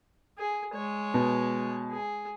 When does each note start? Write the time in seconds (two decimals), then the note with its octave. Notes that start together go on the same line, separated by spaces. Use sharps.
0.38 G#4
0.74 G#3 C#5
1.14 B2
1.91 G#4